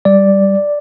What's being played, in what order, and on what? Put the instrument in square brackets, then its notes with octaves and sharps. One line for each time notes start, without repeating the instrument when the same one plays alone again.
[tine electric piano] G3 D5